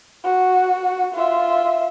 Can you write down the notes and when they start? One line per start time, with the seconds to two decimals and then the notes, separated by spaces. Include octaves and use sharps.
0.25 F#4
1.14 F4 E5